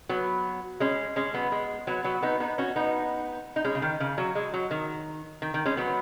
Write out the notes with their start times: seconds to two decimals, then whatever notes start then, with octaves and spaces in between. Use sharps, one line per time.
0.09 F#3 B3
0.80 G#3 C#4
1.16 G#3 C#4
1.34 F#3 B3
1.52 G#3
1.87 F#3 B3
2.04 F#3 B3
2.23 B3 D#4
2.40 B3 D#4
2.58 C#4 F#4
2.76 B3 D#4
3.56 D#4
3.64 G#3 C#4
3.75 C#3
3.82 D#3
4.00 C#3
4.18 F#3
4.35 G#3
4.54 F#3
4.71 D#3
5.42 D#3
5.54 D#3
5.65 G#3 C#4
5.77 F#3 B3